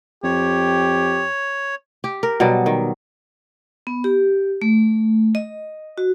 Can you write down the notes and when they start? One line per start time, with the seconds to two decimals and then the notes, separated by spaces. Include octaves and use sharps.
0.24 F2 G4 C#5
2.04 G4
2.23 A#4
2.40 B2 F#3 G3
2.66 D#3
3.87 B3
4.04 G4
4.62 A3
5.35 D#5
5.98 F#4